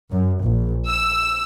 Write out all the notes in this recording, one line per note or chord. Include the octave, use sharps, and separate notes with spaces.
F#2
A#1
E6